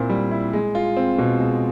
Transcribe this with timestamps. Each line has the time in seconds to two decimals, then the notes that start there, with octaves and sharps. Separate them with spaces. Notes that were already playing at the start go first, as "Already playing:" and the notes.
Already playing: A#2 C4 E4
0.10 G3
0.31 E4
0.53 G#3
0.75 F4
0.97 C4
1.19 B2
1.40 G#3